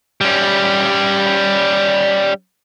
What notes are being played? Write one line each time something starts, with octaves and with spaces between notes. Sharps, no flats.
G3 C#4